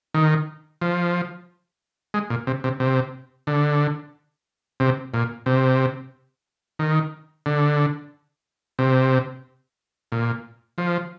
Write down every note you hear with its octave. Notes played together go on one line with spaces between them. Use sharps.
D#3
F3
G#3
A#2
C3
C3
C3
D3
C3
A#2
C3
D#3
D3
C3
A#2
F3